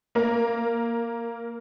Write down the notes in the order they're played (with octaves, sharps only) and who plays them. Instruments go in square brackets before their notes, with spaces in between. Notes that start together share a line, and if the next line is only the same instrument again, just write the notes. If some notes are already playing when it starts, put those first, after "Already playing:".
[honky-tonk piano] A#3 A#4